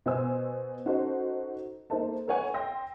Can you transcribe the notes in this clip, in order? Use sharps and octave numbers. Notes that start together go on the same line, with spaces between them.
B2 B3 C5 G#5 E6
C#4 D#4 F#4 A4 C5
A#3 D#4 A4 C5 E5 A5
A4 B4 C#5 F#5 G#5
G5 C6 E6 A#6